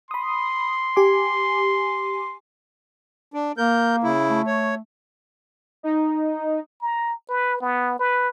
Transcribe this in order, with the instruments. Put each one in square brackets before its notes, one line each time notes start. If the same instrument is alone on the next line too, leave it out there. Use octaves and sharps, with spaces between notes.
[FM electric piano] B5 D#6 [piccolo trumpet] C6
[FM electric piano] G4 G#5 D6
[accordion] D4
[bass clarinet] A#3 [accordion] A#4 G6
[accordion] C#3 E4
[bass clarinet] A3
[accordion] C#5
[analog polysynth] D#4
[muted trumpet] A#5
B4
B3
B4